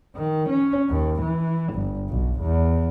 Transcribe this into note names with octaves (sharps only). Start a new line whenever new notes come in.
D#3
C#4
D#2
E3
G1
B1
E2